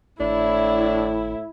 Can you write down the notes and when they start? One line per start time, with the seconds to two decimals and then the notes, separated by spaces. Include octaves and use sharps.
0.20 G#1 A2 D4 E4